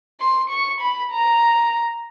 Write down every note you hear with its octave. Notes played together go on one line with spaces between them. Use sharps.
C6
C#6
B5
A#5